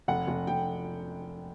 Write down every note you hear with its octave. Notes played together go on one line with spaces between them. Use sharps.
F1 F#5
F1
F1 G5